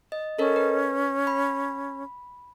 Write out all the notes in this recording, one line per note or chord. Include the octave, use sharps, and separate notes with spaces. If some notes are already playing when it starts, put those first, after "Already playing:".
D#5
C#4 A4 A#4 D#5
B4
B5